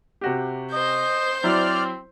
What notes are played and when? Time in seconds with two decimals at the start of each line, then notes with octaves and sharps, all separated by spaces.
0.21 C3 F#4 G4
0.73 C5 D#5 G6
1.44 F#3 C4 E4 D5 F6